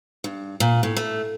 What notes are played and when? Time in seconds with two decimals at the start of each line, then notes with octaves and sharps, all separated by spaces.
0.24 G2
0.60 A#2
0.83 A2
0.97 A3